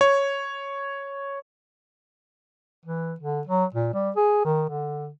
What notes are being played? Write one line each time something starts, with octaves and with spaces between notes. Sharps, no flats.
C#5
E3
D3
F#3
A#2
G3
G#4
D#3
D3